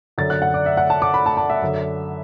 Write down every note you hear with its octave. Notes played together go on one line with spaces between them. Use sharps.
F#2 D3 A6
F#6
F#5
D5
E5
F#5
A5
D6
B5
A5
A5
E5
F#2 D3